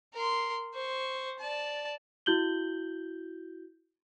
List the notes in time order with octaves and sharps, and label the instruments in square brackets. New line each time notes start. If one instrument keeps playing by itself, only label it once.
[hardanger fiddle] A#4 C6
C5 C#6
D5 A5
[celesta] E4 F#4 G6 F#7 G7